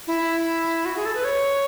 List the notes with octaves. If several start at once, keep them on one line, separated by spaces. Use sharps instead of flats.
E4
F#4
G#4
A4
B4
C#5